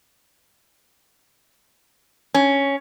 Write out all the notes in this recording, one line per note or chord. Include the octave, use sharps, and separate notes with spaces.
C#4